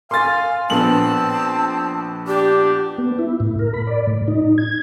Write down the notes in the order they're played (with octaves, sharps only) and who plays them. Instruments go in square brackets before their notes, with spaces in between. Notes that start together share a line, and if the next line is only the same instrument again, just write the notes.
[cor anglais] F5 [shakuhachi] G#5 [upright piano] C6 A6
[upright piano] A#1 B3 F#7 [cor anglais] C4 [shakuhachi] A5
[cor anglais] D4 [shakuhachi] G4
[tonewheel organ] B3
E4
A2
A#4
B5
D5
A2
D#4
G#6